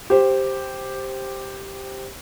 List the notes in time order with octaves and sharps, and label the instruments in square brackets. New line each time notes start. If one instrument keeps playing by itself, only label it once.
[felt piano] G4 C5